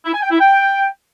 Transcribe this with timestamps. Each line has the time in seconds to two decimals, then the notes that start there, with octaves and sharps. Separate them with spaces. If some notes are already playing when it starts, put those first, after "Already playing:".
0.05 E4
0.14 G#5
0.22 G5
0.31 E4
0.39 G5